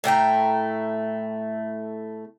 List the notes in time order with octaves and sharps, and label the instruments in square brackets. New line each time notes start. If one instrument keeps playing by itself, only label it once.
[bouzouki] A2 A3 G5 A#5